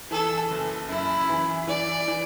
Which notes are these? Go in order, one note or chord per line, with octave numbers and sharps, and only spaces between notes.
E3 A4
F#1
F#2 E4
E3
E3 D5
E3